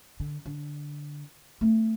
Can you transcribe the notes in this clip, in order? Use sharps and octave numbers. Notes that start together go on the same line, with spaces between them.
D3
D3
A3 C4